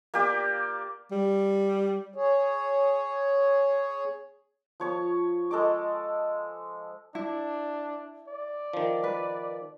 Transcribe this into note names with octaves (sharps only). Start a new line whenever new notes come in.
A#3 G4 D5
G3
G#4 C#5
F3 C#5 A5
G#3 A4 D#5 D6
D4 E4
D5
D#3 F3
B4